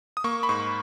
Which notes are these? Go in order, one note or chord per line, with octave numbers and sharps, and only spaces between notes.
D#6
A#3 C#6
B5
G#2 C#6